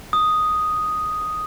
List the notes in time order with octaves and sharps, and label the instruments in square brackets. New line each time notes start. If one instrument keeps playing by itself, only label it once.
[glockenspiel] D#6